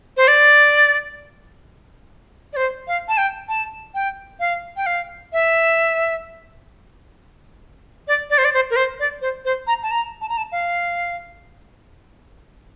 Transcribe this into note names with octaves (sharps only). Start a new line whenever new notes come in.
C5
D5
D5
C5
F5
A5
G5
A5
G5
F5
G5
F5
E5
D5
D5
C5
D5
C5
A#4
C5
D5
C5
C5
A#5
A5
A#5
A5
A#5
A5
F5